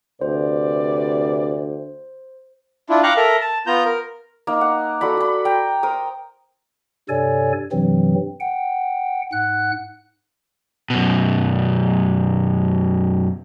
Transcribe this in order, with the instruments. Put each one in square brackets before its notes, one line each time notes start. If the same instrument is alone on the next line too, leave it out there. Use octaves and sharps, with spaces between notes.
[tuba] D2 [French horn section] C3 B4 D5 [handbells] C5
[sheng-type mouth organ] D4 E4 F4
F5 G5 A#5 C#6 D6 F#6
A4 A#4 E5 A#5
A5
B3 F4 A#5 G6
A#4
[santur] A#3 D#4
F#5
F#4 A4 D5 B5
F#4 B5
G5 A#5
A#4 C5 D#6
[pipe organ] G2 C3 A4 C#5 D5 G#5
G2 C3 E3 F#3 C4
F#5 G5
G#2 F#5 F#6
[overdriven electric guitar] F#2 B2